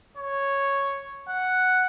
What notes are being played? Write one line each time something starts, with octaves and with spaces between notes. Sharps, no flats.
C#5
F#5